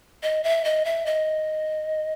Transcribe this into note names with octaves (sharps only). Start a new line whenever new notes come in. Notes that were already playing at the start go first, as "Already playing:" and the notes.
D#5
E5
D#5
E5
D#5